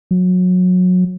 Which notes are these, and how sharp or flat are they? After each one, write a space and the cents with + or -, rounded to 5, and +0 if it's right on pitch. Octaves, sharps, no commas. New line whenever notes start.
F#3 -25